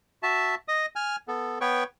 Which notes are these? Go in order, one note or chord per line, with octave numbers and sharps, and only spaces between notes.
F#4 E5 A5
D#5 D#6
G#5 F6
B3 A4
B3 B4 C#5 G5 C#6